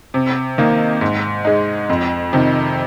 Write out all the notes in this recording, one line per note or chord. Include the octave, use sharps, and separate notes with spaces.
C3
D#3 A#3 D#4
G#2
G#3 D#4
F2
C3 D#3